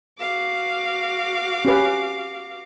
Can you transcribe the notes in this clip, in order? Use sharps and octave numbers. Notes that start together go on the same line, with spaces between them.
F#4 F5 D6
C#4 G4 B4